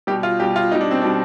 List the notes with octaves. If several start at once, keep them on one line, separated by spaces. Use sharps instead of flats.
B2 G3 G4
F4
B2 G3 G4
F4
B2 G3 D#4
D4
C4
B2 G3 D4